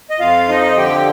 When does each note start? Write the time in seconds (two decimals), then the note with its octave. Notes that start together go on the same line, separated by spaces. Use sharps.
0.10 D#5
0.19 F2 F4 F5
0.49 F3 D#4 D#5
0.77 D3 G4 G5